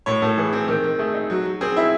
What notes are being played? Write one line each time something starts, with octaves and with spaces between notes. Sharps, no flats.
A2 C#5
A2 A4
E3 G#4
C4
D#3
D#3
A3 G#4
D#4
F#3
F#3
C4 G#4
E4